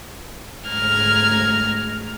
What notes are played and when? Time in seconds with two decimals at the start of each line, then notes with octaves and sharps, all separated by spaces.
0.68 D2 G#2 A#5 F6 G#6